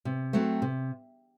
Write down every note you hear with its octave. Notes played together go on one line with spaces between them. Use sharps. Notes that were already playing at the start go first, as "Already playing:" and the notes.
C3
F#3 A3 C4
C3